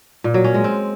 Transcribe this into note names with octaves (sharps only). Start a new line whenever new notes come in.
A#2
F#3
C#4
G#3
C4